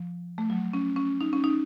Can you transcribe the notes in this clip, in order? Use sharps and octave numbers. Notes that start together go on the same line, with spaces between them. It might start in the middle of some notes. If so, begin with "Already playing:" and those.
Already playing: F3
A3
F#3
C#4
C#4
D#4
C#4
D#4